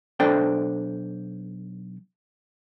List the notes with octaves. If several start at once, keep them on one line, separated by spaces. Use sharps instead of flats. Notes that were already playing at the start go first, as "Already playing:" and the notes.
B1 D4 A4 C5 G5